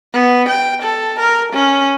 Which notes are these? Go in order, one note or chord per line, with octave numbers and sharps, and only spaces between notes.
B3
G5
A4
A#4
C#4